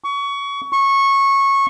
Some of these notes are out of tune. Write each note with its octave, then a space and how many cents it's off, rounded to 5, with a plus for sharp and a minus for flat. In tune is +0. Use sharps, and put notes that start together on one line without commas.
C#6 +25
C#6 -15